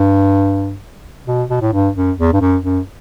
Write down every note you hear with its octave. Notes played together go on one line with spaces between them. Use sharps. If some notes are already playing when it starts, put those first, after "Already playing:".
Already playing: G2
B2
B2
A2
G2
F#2
E2
G2
F#2
F#2